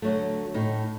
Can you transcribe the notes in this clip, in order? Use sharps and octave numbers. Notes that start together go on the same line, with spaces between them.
D3 F#3 A3
A2 D#4